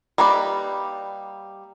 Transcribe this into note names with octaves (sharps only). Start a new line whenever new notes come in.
G3 A#3 D#4 B4 D5